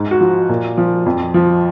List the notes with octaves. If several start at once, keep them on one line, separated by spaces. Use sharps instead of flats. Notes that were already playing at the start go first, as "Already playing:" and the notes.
Already playing: G#2
F#4
F3
A#2
F3
F2
F3